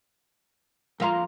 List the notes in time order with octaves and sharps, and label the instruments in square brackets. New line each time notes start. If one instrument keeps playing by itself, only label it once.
[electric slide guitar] F2 F5 A#5 [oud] A#3 F4